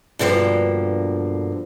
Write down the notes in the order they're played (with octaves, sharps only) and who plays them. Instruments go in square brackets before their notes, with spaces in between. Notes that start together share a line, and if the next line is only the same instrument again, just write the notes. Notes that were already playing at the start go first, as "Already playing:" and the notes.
[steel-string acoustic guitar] G2 B2 D3 F3 G3 A#3